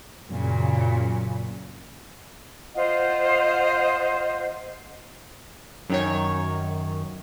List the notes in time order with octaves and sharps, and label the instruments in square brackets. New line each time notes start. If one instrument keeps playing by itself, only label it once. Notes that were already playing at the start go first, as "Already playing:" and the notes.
[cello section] F#2 A#2 C#3
[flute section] F4 C5 D#5 F#5
[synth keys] F#2 D#3 C#5